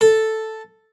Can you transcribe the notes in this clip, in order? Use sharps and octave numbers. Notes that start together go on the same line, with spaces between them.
A4